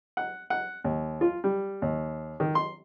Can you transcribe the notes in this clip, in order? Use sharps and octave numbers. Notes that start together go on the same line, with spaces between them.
F#5
F#5
D#2
F4
G3
D#2
D#3
C6